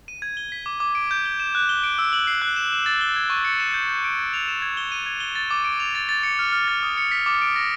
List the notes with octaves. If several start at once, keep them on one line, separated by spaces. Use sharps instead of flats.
D#7
G#6
G7
B6
D6
D6
D7
G6
G7
E7
F#6
G7
D7
E6
F#7
C7
F#6
E7
E7
A6
G7
G#6
C#6
C#7
E7
G6
G6
D7
G#6
F7
E7
G#6
G7
D#7
G#6
G7
A6
D6
D7
F7
A6
A6
C#7
F6
F6
A6
D#6
C#7
B6
D6
D7
A#6